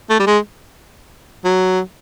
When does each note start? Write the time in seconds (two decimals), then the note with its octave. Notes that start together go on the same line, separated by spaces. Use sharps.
0.10 A3
0.19 G3
0.27 G#3
1.45 F#3